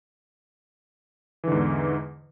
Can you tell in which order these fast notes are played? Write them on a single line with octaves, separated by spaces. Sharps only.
E3 D3 G#2 E2